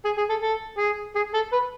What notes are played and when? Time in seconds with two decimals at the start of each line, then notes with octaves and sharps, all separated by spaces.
0.05 G#4
0.17 G#4
0.29 A4
0.42 A4
0.78 G#4
1.15 G#4
1.34 A4
1.52 B4